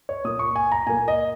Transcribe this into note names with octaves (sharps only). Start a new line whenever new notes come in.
C#5
A#2 A#3 D#6
C#6
G#5
A#5
A#2 A#3 G#5
D#5